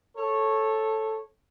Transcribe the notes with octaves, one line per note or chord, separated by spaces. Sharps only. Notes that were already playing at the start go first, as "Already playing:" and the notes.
A4 C#5